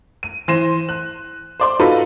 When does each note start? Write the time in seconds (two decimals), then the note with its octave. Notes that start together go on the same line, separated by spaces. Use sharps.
0.23 D#7
0.48 E3 C5 A#6 C7 D#7 E7
0.89 F#6
1.60 C5 D5 C6
1.79 D#4 F4 F#4 A4 B4 B5